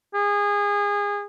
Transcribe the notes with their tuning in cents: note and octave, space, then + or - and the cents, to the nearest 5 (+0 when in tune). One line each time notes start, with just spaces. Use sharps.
G#4 -25